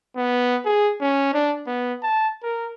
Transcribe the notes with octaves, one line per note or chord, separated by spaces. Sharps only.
B3
G#4
C#4
D4
B3
A5
A#4